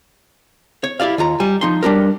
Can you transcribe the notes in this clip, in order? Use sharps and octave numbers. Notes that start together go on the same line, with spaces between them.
C#5
E4 G4 D5 F5
D#2 F4 A#5
G3 G#5
F3 D#4 C6
G3 D4 G4 A#4